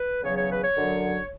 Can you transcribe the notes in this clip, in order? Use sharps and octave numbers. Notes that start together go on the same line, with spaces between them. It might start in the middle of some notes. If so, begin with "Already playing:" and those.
Already playing: B4
E2 C#3 F#3 C#5
C#5
B4
C#5
F#2 D3 F#3